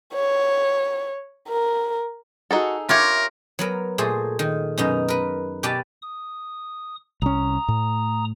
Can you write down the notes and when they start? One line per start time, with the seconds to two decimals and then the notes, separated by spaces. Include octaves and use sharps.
0.14 C#5
1.48 A#4
2.51 D#4 F#4 G#4 A4 F#5
2.89 F4 G4 A#4 C#5 E5
3.59 F#3 B3 A#4
3.98 A#2 A3 G#4 C5
4.39 D#3
4.78 F#2 B2 D#4 A#5
5.08 A#4 B4
5.63 B2 G4 B4 D5 A5
6.02 D#6
7.22 C2 C#4 A#5 D#6
7.68 A2